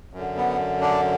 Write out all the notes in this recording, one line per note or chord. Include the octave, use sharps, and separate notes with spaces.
F#2 D3
B3
D4